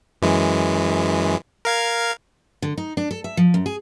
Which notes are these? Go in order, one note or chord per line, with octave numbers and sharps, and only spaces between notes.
F#2 E3 G#3
A#4 F5 G#6
D3
D#4
D4
A4
E5
F3
F#2
G#4